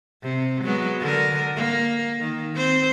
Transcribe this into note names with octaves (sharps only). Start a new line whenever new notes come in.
C3
F#3 G#3 B3
D3 A#4
A#3
D#3
C4 C5